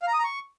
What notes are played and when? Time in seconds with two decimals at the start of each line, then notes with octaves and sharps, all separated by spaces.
0.02 F5
0.08 A#5
0.13 D#6
0.19 A#5
0.24 C#6